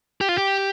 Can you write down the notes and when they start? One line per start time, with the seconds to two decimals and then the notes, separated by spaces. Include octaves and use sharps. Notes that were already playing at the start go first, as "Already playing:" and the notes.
0.21 G4
0.29 F4
0.38 G4